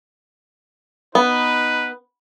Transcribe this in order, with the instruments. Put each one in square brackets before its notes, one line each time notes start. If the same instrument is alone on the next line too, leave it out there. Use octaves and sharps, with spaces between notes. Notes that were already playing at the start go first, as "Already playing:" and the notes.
[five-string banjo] B3 [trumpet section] D#4 B4